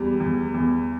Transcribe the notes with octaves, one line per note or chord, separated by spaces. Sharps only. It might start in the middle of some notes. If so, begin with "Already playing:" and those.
Already playing: E2 G3
E2
E2